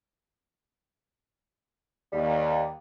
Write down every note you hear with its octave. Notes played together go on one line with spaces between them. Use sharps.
D#2 G3